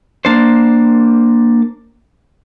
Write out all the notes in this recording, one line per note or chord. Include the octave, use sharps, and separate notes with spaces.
A#3 D4 C5